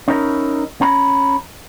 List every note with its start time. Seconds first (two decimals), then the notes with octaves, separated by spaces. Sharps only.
0.08 C#4 D#4 E4 A#4
0.81 C#4 A#5 B5